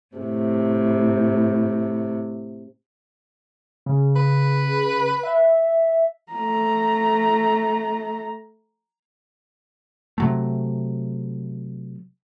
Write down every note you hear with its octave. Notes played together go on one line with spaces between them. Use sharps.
A2 C3
C#3
B4
E5
A3 A#5
C3 F#3 A3